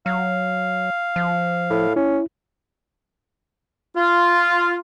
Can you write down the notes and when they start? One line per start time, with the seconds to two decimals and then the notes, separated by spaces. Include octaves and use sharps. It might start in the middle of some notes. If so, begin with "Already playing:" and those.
0.06 F#3 F5
1.16 F3
1.70 A2
1.96 C#4 E4
3.96 F4